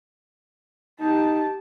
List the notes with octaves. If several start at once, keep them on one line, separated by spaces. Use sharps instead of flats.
D#4 G4 A5